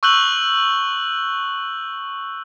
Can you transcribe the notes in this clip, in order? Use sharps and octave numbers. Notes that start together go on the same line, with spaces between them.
C#6 E6 F#6 G6 F#7